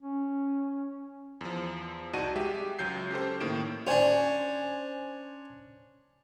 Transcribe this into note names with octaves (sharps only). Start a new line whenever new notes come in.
C#4
E2 F3
C2 D#4 F#4 D5 A5 D#7
G#3 G4 E5
C#2 F#3 G6 C7
C#4 G4 A4 C5
A2 D#3 A#3 D7 E7
C#4 D4 C5 G#5